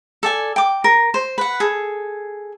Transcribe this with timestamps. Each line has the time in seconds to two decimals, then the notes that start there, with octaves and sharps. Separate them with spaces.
0.23 A4 D5 G#5
0.56 G5 D6
0.84 A#4
1.14 C5
1.38 B4 F#5
1.60 G#4 A4